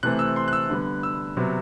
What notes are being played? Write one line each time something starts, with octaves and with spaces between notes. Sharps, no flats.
C3 E3 A3 C4 F#6
E6
C6
F#6
E6
D3 G3 B3
E6
C3 F#3 B3